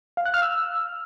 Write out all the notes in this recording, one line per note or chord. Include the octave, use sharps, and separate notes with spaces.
F5
F#6
F6
E6